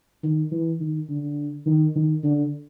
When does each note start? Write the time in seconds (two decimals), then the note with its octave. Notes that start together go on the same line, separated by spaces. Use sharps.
0.23 D#3
0.52 E3
0.80 D#3
1.09 D3
1.66 D#3
1.96 D#3
2.24 D3